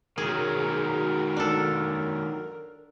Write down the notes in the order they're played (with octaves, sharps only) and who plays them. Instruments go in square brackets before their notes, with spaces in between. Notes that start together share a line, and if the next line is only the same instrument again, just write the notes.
[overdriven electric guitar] D#3 F#3 [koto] G#4 [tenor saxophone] A#4
[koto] D4 A4